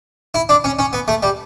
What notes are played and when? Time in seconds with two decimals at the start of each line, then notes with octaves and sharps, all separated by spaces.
0.34 E4
0.49 D4
0.64 C#4
0.79 C#4
0.93 B3
1.08 A3
1.23 G3